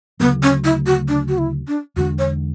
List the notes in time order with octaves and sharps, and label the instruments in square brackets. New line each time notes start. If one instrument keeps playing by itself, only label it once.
[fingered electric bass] D2 C#3 F#3 A3 [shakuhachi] B3
[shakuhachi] C#4
E4
F#4
D4
F#4
E4
D4
[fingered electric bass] E2 D3 G#3 D4 [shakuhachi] F#4
[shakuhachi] C#5